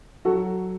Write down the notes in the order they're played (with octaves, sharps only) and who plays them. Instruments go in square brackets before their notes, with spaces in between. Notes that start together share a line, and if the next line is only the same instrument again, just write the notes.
[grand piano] F#3 F#4 A4